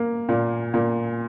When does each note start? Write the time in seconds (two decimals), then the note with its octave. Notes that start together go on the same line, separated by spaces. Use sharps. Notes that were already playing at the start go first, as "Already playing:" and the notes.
Already playing: A#3
0.29 A#2
0.74 A#2